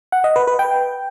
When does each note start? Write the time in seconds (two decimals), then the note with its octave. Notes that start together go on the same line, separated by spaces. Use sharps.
0.12 F#5
0.24 D#5
0.36 B4
0.47 B4
0.59 G5